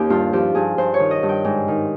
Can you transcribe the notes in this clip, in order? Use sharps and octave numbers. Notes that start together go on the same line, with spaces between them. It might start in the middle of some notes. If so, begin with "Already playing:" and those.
Already playing: D#2 C#4 D#4 G4
G2 F4
F3 G4
G2 G#4
G2 C5
C#5
D#3
D#5
G2
G5
G#2
D#3